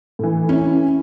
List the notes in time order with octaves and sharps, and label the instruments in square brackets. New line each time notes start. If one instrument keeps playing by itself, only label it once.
[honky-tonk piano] A2 E3
[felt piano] C#4 E4